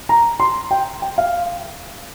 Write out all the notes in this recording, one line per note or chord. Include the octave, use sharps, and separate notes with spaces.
A#5
C6
G5
G5
F5